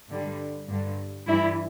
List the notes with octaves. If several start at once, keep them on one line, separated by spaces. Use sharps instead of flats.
G2 D3 G3
G2 D3 G3
G2 E3 G3 E4